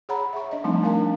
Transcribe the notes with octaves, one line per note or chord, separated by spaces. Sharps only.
G#4 C#5 F#5 A#5 B5
E5 C#6
D4 D#5
F3 G3 A3 C4 D4 D#4
A3 C4 D4 A#4 F5